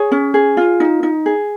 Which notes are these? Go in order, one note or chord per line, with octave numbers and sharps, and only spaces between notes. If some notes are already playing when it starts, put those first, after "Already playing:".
Already playing: G#4 C#5
C#4
G#4
F4
D#4
D#4
G#4